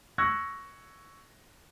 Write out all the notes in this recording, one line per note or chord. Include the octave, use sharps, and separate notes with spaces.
C#6 E6 F#6 G#6 A#6